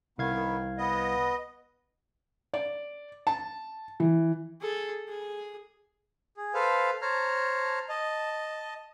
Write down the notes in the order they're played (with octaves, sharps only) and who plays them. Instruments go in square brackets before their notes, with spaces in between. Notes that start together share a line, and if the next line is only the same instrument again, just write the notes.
[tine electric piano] C2 F5 G#6 [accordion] D#3 B3
[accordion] B3 D#5
[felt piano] D5
A5
E3
[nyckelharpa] G#4 A4
G#4
[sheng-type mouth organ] G#4
A4 B4 C5 F5
C5 C#5 A5 A#5 F6
D#5 A5